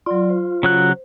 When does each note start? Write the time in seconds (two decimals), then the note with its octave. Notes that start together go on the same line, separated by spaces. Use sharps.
0.06 F#3 F4 D5
0.30 C5
0.63 C#3 F#3 F#6